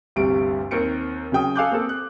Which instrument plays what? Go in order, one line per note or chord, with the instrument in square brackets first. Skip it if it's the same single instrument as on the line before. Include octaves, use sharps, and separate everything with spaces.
[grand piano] G1 D2 C3 G3 D7
D#2 C4 A#4 C#7 D7
C#3 F#3 G5 D#6
A4 F5 G#5 D6 F#6 G6
A#3 C4 A4
F#6